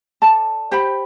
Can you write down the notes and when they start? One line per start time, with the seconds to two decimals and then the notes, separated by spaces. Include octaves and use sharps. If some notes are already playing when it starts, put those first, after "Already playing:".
0.22 A4 D5 A5
0.71 G4 C5 G5 B5